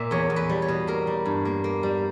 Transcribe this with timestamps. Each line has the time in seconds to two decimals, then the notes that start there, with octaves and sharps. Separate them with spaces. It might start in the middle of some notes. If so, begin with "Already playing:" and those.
Already playing: A#2 A#3 E5
0.11 E2 C#5
0.30 E2
0.36 B4
0.49 G3
0.62 C#5
0.68 B2
0.87 A#3 A#4
1.07 G3
1.25 G2
1.45 A#3
1.64 A#3
1.83 G3